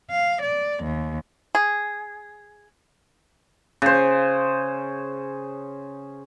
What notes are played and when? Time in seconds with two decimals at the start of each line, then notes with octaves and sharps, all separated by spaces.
0.10 F5
0.42 D5
0.84 D#2
1.55 G#4
3.82 C#3 C5